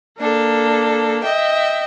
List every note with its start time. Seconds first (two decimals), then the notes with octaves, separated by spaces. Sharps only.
0.18 A#3 D4 A4
1.23 D#5 E5 G5